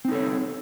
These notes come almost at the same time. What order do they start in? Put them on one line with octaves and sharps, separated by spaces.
C4 D#4 A4 C#5